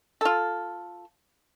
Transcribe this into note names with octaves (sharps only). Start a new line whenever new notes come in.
F4 A4